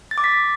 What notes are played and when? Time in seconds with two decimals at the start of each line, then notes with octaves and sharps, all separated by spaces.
0.11 A6
0.18 D6
0.24 B6